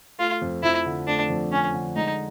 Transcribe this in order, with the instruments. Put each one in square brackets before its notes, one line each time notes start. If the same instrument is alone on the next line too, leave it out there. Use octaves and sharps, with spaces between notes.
[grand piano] A3 [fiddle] F4
[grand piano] F2
[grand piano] F3 [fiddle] E4
[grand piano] D3
[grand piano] A3 [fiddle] D4
[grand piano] F2
[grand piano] F3 [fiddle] C#4
[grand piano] D3
[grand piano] G#3 [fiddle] D#4